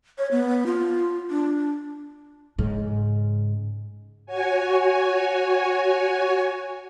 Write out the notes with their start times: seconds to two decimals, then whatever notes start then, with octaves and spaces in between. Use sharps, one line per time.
0.18 C#5
0.31 B3
0.66 F4
1.30 D4
2.58 G#2 C#3
4.26 F#4 C#5 G#5